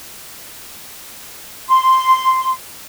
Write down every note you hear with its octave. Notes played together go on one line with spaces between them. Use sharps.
C6